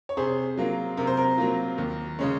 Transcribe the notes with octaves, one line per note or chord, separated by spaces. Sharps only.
C#5
C3 G#4 C5
F#3 A#3 F4
C3 A#4
C5
A#4
F#3 A#3 F4
D#2
C#3 G#3 C#4